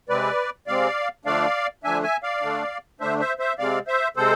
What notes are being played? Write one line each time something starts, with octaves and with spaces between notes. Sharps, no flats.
C3 G#3 C4 B4 D5
C3 G#3 C4 D5 F5
D3 F3 A3 D4 D5 F5
D3 F3 A3 D4 E5 G#5
E5 G#5
D5 F5
D3 A3 D4
D3 A3 D4 C5 E5
C5 E5
C5 E5
C3 G#3 C4 D5 F5
C5 E5
C3 G#3 C4 A4 C5